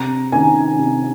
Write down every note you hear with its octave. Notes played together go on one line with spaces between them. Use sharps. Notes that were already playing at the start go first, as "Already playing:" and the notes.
Already playing: C3 A#5
D#3 A#3 C#4 G#5
C3